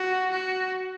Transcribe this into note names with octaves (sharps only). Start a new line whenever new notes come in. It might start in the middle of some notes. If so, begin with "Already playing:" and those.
Already playing: F#4
F#4